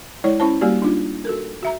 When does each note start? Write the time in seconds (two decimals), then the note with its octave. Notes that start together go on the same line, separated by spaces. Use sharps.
0.24 G#3 E4 C#5 D5
0.40 C#4 E4 C5 A5
0.61 G3 A#3 F#4 G4 D5
0.82 D4 D#4 F4
1.25 F#4 A4 A#4
1.63 F#4 E5 A#5